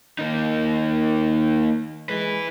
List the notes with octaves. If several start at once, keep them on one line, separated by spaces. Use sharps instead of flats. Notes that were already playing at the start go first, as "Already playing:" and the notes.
D#3 A#3 D#4
G#3 E4 B4